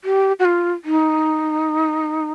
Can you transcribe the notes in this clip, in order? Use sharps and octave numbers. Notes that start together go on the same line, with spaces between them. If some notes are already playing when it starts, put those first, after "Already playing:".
G4
F#4
F4
D#4